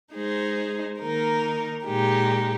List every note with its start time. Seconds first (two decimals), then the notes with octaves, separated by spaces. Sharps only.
0.13 G#3 D#4 G#4 C5
0.99 D#3 A#3 D#4 A#4
1.84 A#2 G#3 D#4 G4